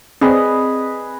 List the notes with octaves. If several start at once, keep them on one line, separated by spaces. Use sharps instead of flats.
C4 G#4 B4 D5 D#5